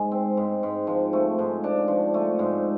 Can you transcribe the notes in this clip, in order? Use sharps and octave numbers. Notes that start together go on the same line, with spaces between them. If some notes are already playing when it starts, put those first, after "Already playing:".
Already playing: G#2 G#3
C4
G#2
G#2
F3
A3
G#2
D4
F3
A3
G#2